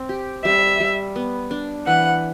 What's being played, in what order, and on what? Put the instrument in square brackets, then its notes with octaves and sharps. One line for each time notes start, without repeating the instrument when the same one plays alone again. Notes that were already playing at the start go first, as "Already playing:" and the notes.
Already playing: [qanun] C4
G4
[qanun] G3 [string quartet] E5
[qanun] G3
B3
D4
[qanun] E3 [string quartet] F#5